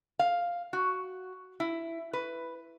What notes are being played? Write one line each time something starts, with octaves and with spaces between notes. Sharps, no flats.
F5
F#4
E4
B4